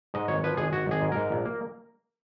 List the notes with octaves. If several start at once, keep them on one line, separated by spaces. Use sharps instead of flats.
G#2 D#5
G#1 C#5
F3 B4
G#1 G#4
G#1 F#4
G#1 G#4
G#2
G#2 A#4
A#1
A#3